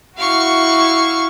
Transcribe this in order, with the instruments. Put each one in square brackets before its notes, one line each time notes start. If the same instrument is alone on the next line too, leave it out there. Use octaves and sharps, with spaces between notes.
[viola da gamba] E4 F#4 [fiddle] F5 C#6